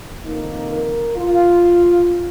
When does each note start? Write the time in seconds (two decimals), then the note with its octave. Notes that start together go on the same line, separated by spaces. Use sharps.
0.22 F2 D#3 A#3 D#4
0.69 A#4
1.16 F4